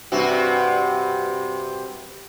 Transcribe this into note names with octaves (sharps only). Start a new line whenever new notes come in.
G2 C3 F#4